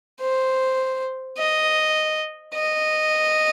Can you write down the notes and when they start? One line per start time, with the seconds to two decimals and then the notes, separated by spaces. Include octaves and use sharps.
0.21 C5
1.38 D#5
2.54 D#5